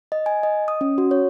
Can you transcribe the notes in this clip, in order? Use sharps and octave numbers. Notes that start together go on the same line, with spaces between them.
D#5
G#5
D#5
D#6
C#4
F#4
C#5